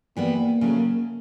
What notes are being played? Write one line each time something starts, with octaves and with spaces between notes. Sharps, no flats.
E3 G3 A#3 B3
C#3 F#3 A3 C#4